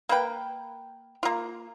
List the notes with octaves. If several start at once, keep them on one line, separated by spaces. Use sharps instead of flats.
A#3 A#4 B4 G5
A#3 F4